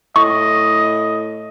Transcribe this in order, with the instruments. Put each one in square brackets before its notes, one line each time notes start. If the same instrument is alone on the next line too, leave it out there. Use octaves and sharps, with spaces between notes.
[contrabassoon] A2 [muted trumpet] D#5 [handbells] C#6